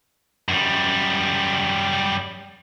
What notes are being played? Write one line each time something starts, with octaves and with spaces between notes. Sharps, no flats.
F#2 G3